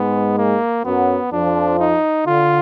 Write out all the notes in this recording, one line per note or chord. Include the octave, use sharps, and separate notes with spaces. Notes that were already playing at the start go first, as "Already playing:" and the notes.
Already playing: G#2 G#3 B3
A#3
F#2 F#3 B3
F2 F3 D4
D#4
D3 F4